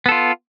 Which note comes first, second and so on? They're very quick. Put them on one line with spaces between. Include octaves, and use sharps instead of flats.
B3 A4 F4